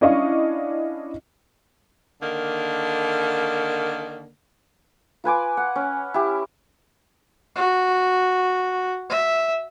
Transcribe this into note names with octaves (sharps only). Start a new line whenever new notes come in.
C#4 D4 E4 D#5 F5 C#6
D3 D#3 A#3
F4 B4 G#5 D6
F#5
C#4
E4 G4
F#4
E5